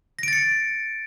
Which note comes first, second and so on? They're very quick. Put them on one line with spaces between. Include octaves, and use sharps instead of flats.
A#6 D7 A6 C#7